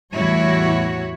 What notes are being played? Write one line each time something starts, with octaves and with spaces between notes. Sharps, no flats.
E2 A2 G3 E4 F#4 C#5